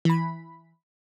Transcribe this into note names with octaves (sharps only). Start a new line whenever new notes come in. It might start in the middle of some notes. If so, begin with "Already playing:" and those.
E3 B5